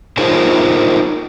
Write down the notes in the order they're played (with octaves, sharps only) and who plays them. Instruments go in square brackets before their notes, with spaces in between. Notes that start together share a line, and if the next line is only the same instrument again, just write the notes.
[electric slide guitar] D#4 F4 G#4 A#4 C5 C#5